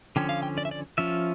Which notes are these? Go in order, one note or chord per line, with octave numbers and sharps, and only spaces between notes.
D3 F3 C#4 G5
F5
G5
D5
E5
D5
F3 C#4 F4 E5